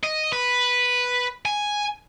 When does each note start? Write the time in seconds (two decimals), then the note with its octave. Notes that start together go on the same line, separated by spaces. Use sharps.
0.03 D#5
0.33 B4
1.45 G#5